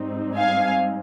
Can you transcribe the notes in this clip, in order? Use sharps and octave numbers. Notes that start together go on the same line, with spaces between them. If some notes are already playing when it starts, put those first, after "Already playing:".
Already playing: G#2 G3 C4 D#4
F5 G#5